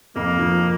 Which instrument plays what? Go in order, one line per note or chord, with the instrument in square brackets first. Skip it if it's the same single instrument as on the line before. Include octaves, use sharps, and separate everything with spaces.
[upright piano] F2 [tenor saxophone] A#3
[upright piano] F3